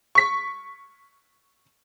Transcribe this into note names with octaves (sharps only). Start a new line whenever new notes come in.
C#6 B6